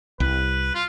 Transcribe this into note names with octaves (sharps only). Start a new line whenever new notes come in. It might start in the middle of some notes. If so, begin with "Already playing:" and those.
C2 B4
F4